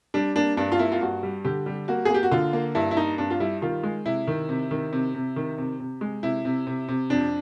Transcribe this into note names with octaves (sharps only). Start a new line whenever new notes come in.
G3 D4
A#3 D4
G2 D4
F4
A#3 E4
F4
G2 F#4
G3
D3 G4
G3
A#3 F#4
G#4
A#3 G4
F#4
D3 F4
A#3
G2 E4
E4
A#3 D#4
G2 D4
F4
G3 E4
D#3 F4
G#3
C3 E4
D#3
C3
D#3
C3
C3
D#3
C3
C3
G#3
C3 E4
C3
C3
C3
F2 D4